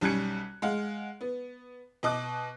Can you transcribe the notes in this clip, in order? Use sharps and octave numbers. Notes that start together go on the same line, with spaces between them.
B1 G3 C#4 F#6 G#6 C#7
G#3 F5 F#5
B3
B2 D#5 D6 F#6